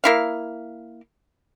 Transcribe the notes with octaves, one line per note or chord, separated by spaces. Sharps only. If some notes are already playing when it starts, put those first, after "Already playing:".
A#3 E4 F5